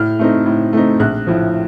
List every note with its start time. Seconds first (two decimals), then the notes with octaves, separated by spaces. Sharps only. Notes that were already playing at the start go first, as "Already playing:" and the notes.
Already playing: A2 F6
0.19 A3 C4 D#4
0.46 A2
0.73 A3 C4 D#4
0.99 A#1 F#6
1.27 A2 F3